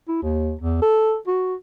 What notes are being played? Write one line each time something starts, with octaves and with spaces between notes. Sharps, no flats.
E4
D#2
E2
A4
F#4